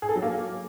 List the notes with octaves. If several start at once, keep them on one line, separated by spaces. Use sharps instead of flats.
G#4
A4
F#3
A#3